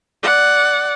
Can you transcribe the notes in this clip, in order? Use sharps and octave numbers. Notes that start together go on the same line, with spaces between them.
D5 F#5